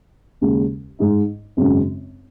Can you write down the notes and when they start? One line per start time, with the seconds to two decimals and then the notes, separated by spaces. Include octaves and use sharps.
0.41 D#2 C#3 G#3
0.99 G#2 G#3 D#4
1.57 G#1 F#2 C#3 G#3 C#4